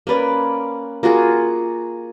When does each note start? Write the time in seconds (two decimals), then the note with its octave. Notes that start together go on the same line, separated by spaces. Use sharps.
0.07 A#3 C#4 B4 D5
1.03 A#3 F4 F#4 G#4